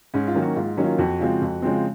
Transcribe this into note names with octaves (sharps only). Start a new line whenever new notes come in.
G#2 C#4
F4
D#3 F#3 A#3 C#4
F#4
G#2 F4
D#3 F#3 A#3 C#4
F4
F2 F#4
C#3 F3 G#3 C4
F2
C#3 F3 G#3 C4